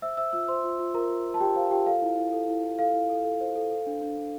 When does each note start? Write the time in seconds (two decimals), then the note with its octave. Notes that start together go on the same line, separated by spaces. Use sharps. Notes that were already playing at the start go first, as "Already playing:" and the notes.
0.02 C5 E5 E6
0.17 C5 E5 E6
0.33 F4 E5 E6
0.48 C5 C6
0.64 F4
0.79 F4
0.94 F4 A#4 A#5
1.10 F4
1.25 F4
1.34 A5
1.40 F4 G4 G5
1.56 C5 F5
1.71 F4 G4 G5
1.86 A4 F5
2.02 E4
2.17 E4
2.32 A4
2.48 E4
2.64 E4
2.79 A4 F5
2.94 E4
3.10 A4
3.25 A4
3.40 C5
3.56 A4
3.71 A4
3.86 D4
4.02 D4
4.17 D4